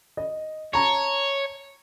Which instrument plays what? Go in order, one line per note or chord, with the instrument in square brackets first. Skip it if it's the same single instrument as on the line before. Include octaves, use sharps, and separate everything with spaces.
[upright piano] D#5
[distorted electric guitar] C#5 [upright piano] A5 A#5